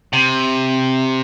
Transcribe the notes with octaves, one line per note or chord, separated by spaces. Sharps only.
C3